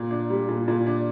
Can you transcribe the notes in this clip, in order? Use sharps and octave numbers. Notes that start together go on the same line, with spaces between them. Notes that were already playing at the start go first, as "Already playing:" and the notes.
Already playing: A#2
D4
G3
A#2
A#2
D4